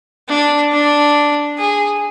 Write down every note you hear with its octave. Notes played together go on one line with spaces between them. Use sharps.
D4
D4
G#4